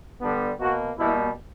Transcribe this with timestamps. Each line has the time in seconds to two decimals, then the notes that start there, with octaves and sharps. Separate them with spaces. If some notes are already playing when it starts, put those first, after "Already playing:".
0.21 D3 G3 B3 D4
0.59 B2 A#3 F#4
0.98 B2 G3 A#3 E4